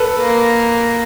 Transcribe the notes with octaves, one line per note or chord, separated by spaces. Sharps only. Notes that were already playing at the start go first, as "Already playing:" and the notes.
Already playing: A4 B4
A#3